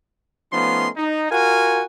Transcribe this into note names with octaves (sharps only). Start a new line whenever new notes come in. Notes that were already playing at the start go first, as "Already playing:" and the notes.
F3 A3 B3 C#4 D#4 C6
D#4
F4 F#4 A#4 F#5 G#5